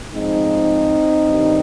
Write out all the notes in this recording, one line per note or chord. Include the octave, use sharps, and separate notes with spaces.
G#2 F3 G#3 C4 D#4
G2 D#3 G3